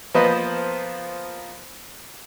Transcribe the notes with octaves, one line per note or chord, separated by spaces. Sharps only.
F3 A#3 B3 B4 C5 D#5